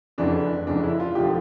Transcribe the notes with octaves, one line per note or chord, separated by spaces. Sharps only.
F1 F2 C#3 E3 D4
F1 F2 C#3 E3 D4
E4
F4
E1 D3 F3 G4